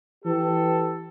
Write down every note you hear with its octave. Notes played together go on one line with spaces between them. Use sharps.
E3 G4 A4